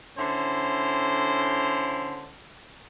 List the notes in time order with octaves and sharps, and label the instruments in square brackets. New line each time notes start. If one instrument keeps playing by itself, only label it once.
[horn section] D3 C#4 E4 C5